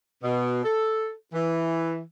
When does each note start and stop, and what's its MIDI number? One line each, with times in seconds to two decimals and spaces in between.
0.23 0.60 47
0.63 1.11 69
1.33 2.01 52